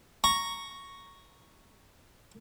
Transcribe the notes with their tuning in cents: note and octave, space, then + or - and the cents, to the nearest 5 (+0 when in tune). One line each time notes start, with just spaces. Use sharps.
A#5 +0 C#6 +0